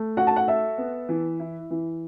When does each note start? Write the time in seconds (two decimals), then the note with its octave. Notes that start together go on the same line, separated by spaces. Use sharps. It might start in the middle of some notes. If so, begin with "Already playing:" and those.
Already playing: A3
0.17 F#4 F#5
0.27 A5
0.36 F#5
0.48 A4 E5
0.78 B3
1.09 E3
1.40 E4
1.71 E3